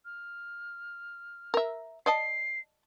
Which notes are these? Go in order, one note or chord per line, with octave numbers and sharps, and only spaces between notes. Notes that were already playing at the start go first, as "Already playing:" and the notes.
F6
A#4 E5
D5 D#5 A5 C7